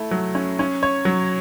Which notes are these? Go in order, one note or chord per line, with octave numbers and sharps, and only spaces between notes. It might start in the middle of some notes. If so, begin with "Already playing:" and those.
Already playing: A3 E4
F#3
C#4
C#4
C#5
F#3